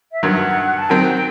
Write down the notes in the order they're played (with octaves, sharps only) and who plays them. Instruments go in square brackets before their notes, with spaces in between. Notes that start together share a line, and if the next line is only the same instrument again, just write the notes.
[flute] E5
[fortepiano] G2 D#3 F#3 [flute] F#5
[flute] A5
[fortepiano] D#3 F#3 C4 [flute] G5
[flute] G5